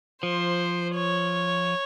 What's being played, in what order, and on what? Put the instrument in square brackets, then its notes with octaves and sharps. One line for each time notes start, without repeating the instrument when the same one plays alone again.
[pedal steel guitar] F3 [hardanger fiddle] C5
[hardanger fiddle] C#5